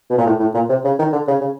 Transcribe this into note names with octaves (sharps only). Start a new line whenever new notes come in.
B2
A#2
A2
A2
A#2
C3
C#3
D#3
D3
C#3
C#3